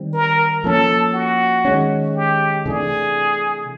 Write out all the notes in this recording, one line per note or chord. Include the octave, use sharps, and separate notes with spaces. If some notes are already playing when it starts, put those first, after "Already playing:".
Already playing: D#3 G3 C4
A#4
F3 A#3 C#4 A4
F#4
D#3 G#3 C#4
G4
C3 E3 A3 D4 G#4